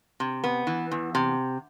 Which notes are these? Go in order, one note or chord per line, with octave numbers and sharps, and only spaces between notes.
C3
B3
E3
E2
C3